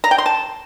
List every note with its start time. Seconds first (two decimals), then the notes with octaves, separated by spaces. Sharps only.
0.04 A#5
0.11 G5
0.18 C6
0.26 A5